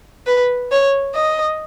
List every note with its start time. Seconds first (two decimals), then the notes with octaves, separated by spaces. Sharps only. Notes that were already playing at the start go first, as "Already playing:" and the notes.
0.27 B4
0.72 C#5
1.15 D#5